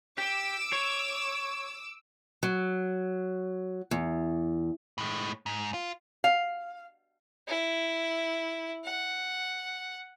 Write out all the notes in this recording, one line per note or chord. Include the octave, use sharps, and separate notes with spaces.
G4 D6 E6
C#5
F#3
E2
A2 G#3
G#2
F4
F5
E4
F#5